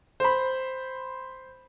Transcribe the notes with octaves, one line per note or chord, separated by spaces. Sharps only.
C5 B5